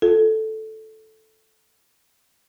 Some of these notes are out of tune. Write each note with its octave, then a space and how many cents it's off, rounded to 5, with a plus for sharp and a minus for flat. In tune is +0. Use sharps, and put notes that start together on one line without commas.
F4 +0 A4 -5